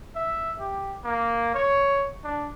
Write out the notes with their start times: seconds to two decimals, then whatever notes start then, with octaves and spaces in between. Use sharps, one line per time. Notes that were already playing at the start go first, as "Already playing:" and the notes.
0.16 E5
0.60 G4
1.04 A#3
1.54 C#5
2.24 D4